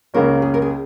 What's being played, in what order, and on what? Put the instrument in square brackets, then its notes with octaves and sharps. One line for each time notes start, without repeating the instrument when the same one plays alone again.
[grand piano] C#2 C#3 A#3 C#4 [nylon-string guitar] A#4
[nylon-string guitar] G#4
A#4
G#4